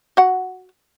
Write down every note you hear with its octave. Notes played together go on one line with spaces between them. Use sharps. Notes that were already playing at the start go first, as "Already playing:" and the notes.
F#4 F#5